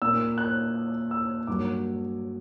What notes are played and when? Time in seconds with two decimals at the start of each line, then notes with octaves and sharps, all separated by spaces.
0.02 A#2 A#3 E6
0.38 F#6
1.11 E6
1.47 G2 F#3 A#3 D6